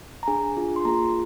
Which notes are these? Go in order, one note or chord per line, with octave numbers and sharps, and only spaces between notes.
A#5
D4 G#4 G#5
D4 F4 G#4
C6
A#3 F4 G#4 A#5